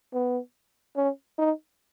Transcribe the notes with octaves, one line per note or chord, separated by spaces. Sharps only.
B3
C#4
D#4